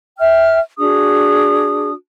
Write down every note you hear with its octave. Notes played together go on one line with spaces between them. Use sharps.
E5 G5 F6
D4 F#4 G#4 D#6